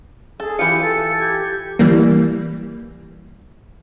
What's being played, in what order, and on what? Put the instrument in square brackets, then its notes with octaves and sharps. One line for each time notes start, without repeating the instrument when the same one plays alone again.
[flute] G#4 [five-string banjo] A4
[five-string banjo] E3 F4 [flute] G4 [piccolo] C#7
[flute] A4
[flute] G4 [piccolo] G#6
[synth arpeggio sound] E3 G3 A#3